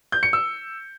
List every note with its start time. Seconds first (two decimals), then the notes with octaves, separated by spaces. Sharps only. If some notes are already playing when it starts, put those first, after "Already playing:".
0.12 G6
0.23 C#7
0.33 E6